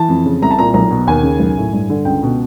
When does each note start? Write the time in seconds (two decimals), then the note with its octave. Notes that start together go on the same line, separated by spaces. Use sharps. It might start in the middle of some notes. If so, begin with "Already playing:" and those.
Already playing: E3 A5
0.09 F2
0.26 C#3
0.42 C2 A#5
0.51 A5
0.59 A#2 A#5
0.74 B1 A#5
0.90 B2
1.07 D#2 G#5
1.23 C#3
1.40 B1
1.57 A2
1.73 G2
1.90 D3
2.05 C#2 G5
2.23 B2